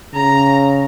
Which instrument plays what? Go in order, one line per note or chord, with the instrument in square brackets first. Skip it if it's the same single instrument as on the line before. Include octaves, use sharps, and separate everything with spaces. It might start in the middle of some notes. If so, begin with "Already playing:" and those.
[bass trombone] C#3 [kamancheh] A#5